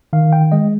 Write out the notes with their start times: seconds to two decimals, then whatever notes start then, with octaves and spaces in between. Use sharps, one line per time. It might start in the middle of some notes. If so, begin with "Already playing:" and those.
0.13 D#3 F5
0.33 G5
0.52 G#3 D#5